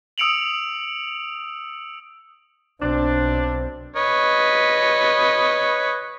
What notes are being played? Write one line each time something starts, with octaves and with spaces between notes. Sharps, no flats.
D#6 E6 C#7 D7 F7 F#7
B1 C4 D4
B4 C#5 D#5